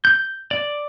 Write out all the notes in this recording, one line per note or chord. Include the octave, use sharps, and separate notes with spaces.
G6
D5